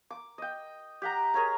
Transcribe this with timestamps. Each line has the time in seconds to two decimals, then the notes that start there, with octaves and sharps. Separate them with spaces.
0.10 D6
0.38 D#5 G5
1.02 G4 F#5 A#5
1.34 G#4 A#4 C#5 A#5